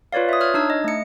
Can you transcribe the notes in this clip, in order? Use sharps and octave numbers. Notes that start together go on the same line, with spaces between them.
F4 B4 C#5 D5 F5
E5 D#6
C#5 F6 G#6
D4 D#4 E6 G#6
D#5
A3 C#7